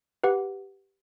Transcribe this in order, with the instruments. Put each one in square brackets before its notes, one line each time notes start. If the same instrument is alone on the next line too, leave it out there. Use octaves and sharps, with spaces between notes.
[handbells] G4 B4 F#5